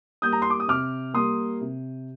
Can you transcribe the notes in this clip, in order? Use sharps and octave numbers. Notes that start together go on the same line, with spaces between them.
G3 A#3 D#6 G6
A#5
C6
D6
D#6
C3 D6 F6
G3 A#3 C6 D#6
C3